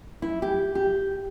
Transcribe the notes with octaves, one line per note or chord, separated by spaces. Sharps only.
E4
G4
G4